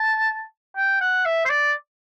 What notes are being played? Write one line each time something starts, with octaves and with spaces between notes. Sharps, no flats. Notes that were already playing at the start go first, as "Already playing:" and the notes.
Already playing: A5
G5
F#5
E5
C5
D5